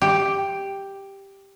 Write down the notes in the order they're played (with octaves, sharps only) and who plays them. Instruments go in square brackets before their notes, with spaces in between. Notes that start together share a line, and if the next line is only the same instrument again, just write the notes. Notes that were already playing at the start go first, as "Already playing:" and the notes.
[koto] G4